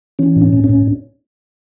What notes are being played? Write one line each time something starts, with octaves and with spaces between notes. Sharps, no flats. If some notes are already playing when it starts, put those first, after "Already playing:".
E3 C#4
A2
C#4
A2
C#4
A2